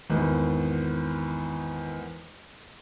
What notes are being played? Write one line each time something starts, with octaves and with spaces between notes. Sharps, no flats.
G#1 E2